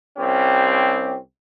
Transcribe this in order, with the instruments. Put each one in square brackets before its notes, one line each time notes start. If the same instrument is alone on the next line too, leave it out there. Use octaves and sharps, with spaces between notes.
[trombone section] C2 C4 C#4 G4